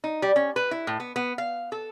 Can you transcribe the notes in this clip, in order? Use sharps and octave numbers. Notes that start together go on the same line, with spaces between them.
D#4
G3
C#4
B4
E4
A2
B3
B3
F5
A4